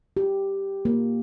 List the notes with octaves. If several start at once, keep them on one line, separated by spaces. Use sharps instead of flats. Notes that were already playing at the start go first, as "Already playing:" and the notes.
G4
A#3